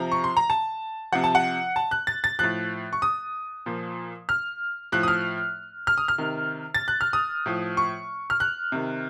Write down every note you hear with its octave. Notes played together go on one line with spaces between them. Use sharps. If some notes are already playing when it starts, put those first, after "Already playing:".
Already playing: C3 F3 A#5
C#6
C6
A#5
A5
C3 F3 F#5
A5
F#5
A5
F#6
A6
A6
A2 F3 F#6
C#6
D#6
A#2 F3
F6
A2 F3 F#6
D#6
F6
F6
D#6
F6
C3 D#3
A6
F#6
F6
D#6
A2 F3
C#6
F6
F#6
C3 D#3